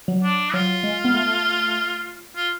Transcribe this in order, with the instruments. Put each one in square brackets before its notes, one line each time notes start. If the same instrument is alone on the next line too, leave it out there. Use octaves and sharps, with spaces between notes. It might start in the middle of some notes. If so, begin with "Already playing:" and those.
[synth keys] F#3
[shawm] D4
[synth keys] F#3 [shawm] F4
[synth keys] G#3
B3
A3
[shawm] F4